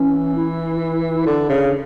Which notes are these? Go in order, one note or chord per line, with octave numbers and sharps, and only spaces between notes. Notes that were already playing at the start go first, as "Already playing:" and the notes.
Already playing: E3 C#4
E4
E4
E4
D3 D4
C#3